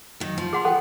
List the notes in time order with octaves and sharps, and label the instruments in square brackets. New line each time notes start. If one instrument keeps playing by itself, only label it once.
[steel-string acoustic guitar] D#3 F#3
F3
[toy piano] G#4 F#5 C6
[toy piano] A4 G5 [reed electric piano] F#5